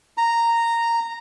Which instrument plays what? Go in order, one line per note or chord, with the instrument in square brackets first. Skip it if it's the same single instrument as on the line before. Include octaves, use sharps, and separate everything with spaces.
[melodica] A#5